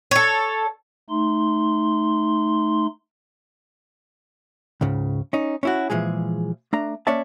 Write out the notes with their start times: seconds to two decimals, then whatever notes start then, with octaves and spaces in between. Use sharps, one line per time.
0.11 A4 C#5
1.10 A3 D#4 C6
4.81 C#2 G#2 C#3
5.33 C#4 D#4
5.63 C#4 E4 F#4
5.90 A#2 E3 F3 G#3 G#4
6.73 A3 D4 A#5
7.07 A#3 C#4 C#5 D5 E5 A5